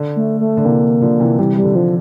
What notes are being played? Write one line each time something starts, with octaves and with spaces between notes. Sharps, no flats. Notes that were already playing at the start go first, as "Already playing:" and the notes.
Already playing: D3
A3
A3
D3
C3 E3 A#3
D3 F3
C3 E3
C3 E3 G3
G3
D3
F3